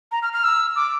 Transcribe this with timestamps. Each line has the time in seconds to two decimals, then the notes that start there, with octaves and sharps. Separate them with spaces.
0.12 A#5
0.23 F6
0.33 F6
0.44 E6
0.76 D6